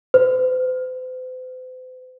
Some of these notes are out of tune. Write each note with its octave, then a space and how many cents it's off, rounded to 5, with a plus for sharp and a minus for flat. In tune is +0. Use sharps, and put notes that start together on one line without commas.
C5 -45